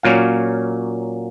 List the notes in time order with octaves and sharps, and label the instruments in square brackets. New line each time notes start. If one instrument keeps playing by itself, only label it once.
[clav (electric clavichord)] A#2 F#3 A#3 C#4 F5